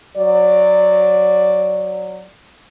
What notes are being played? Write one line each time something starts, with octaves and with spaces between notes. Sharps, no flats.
F#3 D5